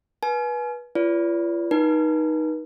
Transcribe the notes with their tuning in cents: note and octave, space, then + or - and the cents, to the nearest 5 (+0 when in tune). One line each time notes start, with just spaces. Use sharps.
B4 -25 G#5 +35
F4 -40 B4 +0 D5 -40
D#4 +0 B4 -40 G#5 +0